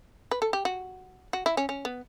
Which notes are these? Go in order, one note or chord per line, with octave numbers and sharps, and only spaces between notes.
B4
A4
G4
F#4
F#4
E4
C#4
C#4
B3